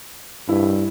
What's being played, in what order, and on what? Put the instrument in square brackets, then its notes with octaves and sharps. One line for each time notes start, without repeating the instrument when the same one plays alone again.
[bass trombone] G2 [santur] E4